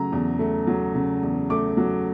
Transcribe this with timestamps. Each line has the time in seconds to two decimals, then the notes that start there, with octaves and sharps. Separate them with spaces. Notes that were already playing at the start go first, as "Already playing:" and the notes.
Already playing: C#3 F#3 A3 A#5
0.12 E2
0.39 A3
0.67 F#3
0.95 C#3
1.23 E2
1.50 A3 D6
1.77 F#3